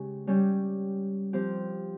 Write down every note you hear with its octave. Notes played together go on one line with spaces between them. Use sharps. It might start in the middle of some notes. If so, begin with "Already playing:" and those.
Already playing: C#3 G#3 C#4 G4
G3 C#4 G4
F3 C4 G4